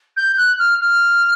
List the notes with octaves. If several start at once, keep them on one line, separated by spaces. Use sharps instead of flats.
G6
F#6
F6
F6